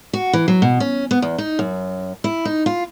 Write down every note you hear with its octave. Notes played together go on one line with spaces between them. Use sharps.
F#4
E3
F#3
B2
C#4
B3
E2
D#4
F#2
E4
D#4
F4